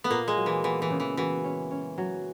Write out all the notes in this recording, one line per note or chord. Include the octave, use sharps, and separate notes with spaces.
B3
A#2 A#3
G#3
F#3
E3
E3 B3
E3
C#3
E3
E3 F#4
C#4
C#4
F#3